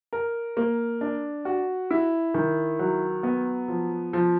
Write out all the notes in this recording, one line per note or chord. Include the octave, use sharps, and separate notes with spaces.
A#4
A#3
D4
F#4
E4
D#3
F#3
B3
F3
F3